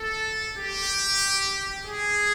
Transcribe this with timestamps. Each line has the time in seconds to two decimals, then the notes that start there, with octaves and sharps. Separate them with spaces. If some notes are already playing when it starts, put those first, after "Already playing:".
Already playing: A4
0.57 G4
1.85 G#4